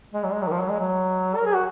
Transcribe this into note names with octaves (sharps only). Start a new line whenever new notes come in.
G#3
F#3
G#3
F#3
D#3
F3
F#3
G#3
F#3
A#4
G#4
F#4